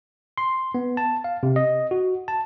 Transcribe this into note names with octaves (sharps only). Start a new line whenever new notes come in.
C6
B3
A5
F5
C3
D#5
F#4
A5